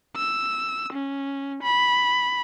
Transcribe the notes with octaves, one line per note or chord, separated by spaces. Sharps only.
E6
C#4
B5